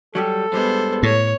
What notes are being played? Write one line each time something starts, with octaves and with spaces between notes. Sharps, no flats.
F#3 G3 G4 A4
G2 G3 G#3 B3 C5
A2 C#5